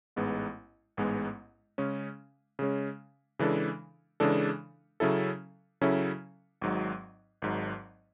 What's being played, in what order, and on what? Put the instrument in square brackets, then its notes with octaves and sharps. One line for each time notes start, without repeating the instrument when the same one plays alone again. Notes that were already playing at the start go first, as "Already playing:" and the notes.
[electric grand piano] A1 G#2 G#3 B3
A1 G#2 G#3 B3
C#3 G#3 C#4
C#3 G#3 C#4
C#3 E3 G#3 D4 A4
C#3 E3 G#3 D4 A4
C#3 F#3 C#4 E4 A4
C#3 F#3 C#4 E4 A4
G#1 G#2 F#3
G#1 G#2 F#3